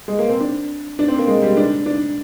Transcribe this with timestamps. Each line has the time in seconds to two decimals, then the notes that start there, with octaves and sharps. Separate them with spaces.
0.08 G#3
0.19 A#3
0.29 C4
0.40 D4
0.99 D4
1.08 C4
1.19 A#3
1.28 G#3
1.42 G3
1.57 D4
1.86 D4